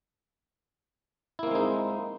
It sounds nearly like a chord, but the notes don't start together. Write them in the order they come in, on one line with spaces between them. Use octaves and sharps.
E4 A#3 C4 G#3 D#4